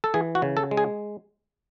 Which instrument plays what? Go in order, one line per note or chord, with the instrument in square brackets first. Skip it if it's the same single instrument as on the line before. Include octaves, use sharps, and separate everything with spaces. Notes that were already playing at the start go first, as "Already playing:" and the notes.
[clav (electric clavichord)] A4
E3 G#4
F#4
C#3
A4
G#3
G#4